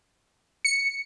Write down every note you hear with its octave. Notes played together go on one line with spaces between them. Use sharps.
C#7